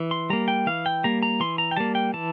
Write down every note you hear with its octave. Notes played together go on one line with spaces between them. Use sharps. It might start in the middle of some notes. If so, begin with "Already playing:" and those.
Already playing: E3
C6
G3 A#3 A#5
G5
E3 F5
G5
G3 A#3 A#5
A#5
E3 C6
A#5
G5
G3 A#3 A5
G5
E3 A5